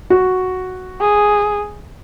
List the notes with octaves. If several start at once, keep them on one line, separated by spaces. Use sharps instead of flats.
F#4
G#4